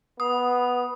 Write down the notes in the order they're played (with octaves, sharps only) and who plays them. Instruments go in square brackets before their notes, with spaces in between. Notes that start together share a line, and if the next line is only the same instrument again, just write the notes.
[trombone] B3 [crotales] D#6